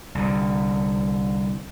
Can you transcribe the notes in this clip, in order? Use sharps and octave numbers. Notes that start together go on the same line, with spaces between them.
C2 D3